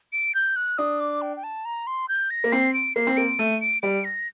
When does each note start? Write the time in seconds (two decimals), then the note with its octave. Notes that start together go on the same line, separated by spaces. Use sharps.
0.13 D7
0.35 G6
0.56 F#6
0.78 D4 D#6
1.00 D6
1.22 G5
1.37 G5
1.43 A5
1.65 A#5
1.87 C6
2.09 G6
2.30 A#6
2.44 A#3
2.52 C4 C7
2.74 D7
2.96 A#3 C7
3.07 C4
3.17 A#3 D7
3.39 A3 D#7
3.61 D7
3.82 G3 D7
4.04 A#6